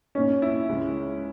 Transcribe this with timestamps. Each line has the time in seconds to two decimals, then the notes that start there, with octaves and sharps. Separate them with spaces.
0.15 A#2 A#3 C#4 D#4
0.42 E4
0.69 C#2 C#3 G#3